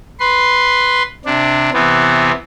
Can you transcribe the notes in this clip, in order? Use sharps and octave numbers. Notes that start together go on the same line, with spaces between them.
B4 C6
C3 D4
C3 E3 B3 C4